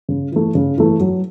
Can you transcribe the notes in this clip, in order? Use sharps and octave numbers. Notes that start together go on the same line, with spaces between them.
C#3
E3 A3
C#3
E3 A3
F#3